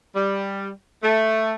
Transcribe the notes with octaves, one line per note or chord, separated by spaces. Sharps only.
G3
A3